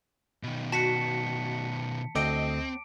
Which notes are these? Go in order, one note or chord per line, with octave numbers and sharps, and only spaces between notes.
B2 D#3
F#4 A5 B6 C#7
D2 C4 A4 D#5 G5 D6 D7